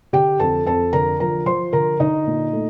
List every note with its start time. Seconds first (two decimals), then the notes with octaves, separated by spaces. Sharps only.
0.13 D3 G4 G5
0.40 F2 A4 A5
0.66 F2 A4 A5
0.93 D3 A#4 A#5
1.20 F3 A#4 A#5
1.46 F3 C5 C6
1.73 D3 A#4 A#5
2.00 D3 D#4 D#5
2.26 A#2
2.53 A3